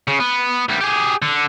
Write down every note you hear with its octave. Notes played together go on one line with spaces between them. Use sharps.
C#3
B3
D2 G3
G4 G#4
D3